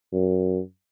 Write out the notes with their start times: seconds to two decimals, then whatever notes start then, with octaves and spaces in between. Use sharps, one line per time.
0.13 F#2